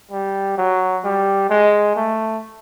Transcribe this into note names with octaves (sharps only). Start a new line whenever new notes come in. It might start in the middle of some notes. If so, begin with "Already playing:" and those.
G3
F#3
G3
G#3
A3